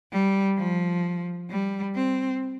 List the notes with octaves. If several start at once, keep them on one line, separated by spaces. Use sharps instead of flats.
G3
F3
G3
C4